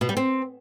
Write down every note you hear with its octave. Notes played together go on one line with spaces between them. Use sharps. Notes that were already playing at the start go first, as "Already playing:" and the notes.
B2
G3
C4